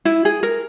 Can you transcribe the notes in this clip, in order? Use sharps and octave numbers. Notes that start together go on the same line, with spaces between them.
E4
G#4
A#4